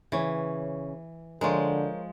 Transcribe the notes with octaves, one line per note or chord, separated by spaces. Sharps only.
C#3 E3 C#5
D3 F3 G#3 A#4 C5 C#5